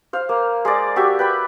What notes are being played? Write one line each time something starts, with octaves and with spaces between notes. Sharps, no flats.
C5 F5
A#3
G#3 D5
F#4 G4 E5
B4 G5 B5